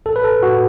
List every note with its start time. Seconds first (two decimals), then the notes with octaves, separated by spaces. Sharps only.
0.06 A1 A4
0.16 B4
0.24 A4
0.42 A2 F#4